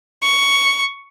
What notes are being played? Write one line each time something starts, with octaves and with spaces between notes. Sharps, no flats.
C#6